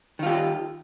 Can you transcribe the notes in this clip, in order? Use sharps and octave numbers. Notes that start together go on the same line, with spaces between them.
D#3 F4 G4